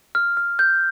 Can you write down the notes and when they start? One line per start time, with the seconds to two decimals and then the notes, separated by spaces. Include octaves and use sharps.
0.15 F6
0.37 F6
0.59 G6